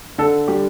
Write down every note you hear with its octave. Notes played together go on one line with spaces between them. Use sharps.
D3 A4
G3 G4